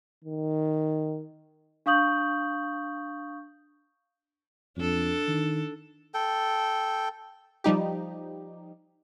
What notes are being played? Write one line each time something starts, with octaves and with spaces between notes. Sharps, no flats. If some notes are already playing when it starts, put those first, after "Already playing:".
D#3
D4 F5 C#6 D#6 G6 F#7
F2 D4 A4
D#3
A4 G5
F3 G3 D#4 G4